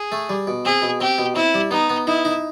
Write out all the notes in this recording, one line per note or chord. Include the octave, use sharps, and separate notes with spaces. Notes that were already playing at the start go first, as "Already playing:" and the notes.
Already playing: G#4
A3
G3
B2
C4 G#4
B2
C4 G4
B2
C4 E4
G3
B3 D#4
B3
D#4 E4
D#4